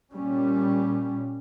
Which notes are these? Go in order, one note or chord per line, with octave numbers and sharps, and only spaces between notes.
A#2 G3 C#4